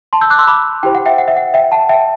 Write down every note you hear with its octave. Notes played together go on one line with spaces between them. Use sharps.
A5 C6
E6 G6
D6 F#6
C6 E6
B5 D6
E4 G4 C5 G5
F#5
E5 G5
F#5
E5
F#5
E5 G5
F#5 A5
E5 G5